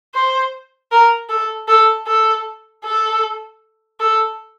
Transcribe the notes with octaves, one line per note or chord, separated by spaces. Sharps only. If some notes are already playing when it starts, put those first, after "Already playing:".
C5
A#4
A4
A4
A4
A4
A4